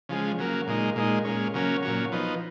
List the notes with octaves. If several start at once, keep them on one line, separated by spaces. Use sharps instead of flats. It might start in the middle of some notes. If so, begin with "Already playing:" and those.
C#3 F3 G#3
C#3 F#3 A#3
A#2 G#3 D#4
A#2 G#3 D#4
A#2 G#3 C#4
C#3 F#3 A#3 C#4
A#2 F#3 C#4
F3 B3 D#4